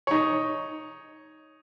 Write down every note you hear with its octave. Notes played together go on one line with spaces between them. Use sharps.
D#4 C#5